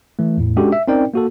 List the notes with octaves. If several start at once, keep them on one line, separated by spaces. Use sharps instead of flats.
E3 A3
E2 A2
G#3 C#4 D4 F#4 G4 A4
E5
C4 C#4 D#4 A#4 D5 G5
A#3 F#4 A4